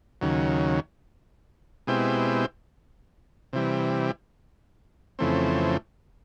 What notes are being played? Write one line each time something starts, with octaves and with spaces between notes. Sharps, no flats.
D#2 C#3 F#3
B2 G#3 C4 E4 G4
C3 E3 G3
F2 C#3 E3 A3 C4